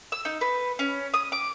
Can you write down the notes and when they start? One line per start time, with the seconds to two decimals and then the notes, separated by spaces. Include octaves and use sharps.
0.12 E6
0.25 D#4
0.41 B4
0.79 C#4
1.14 D#6
1.32 D6